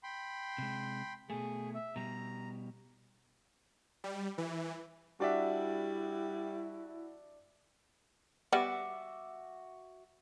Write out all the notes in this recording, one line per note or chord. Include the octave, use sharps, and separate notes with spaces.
G5 B5 C6
C3 G#3
B2 A3 G#4
E5
B2 G3 A#5
G3
E3
G3 D4 E4 F#4 D5 E5
G3 B3 F#4 E5 D6